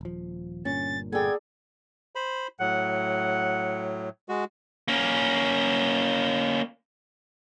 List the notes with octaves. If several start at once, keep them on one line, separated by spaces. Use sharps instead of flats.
D#1 F3
G1 G2 A#2 C#4 A6
B3 G#4 A4 D5 G5 G#6
C5 B5
A2 F#3 F#5
G#3 F#4
A#3 C#4